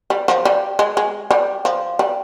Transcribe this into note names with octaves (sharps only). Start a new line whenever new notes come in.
G3
F3
G3
G#3
G#3
G3
F3
G3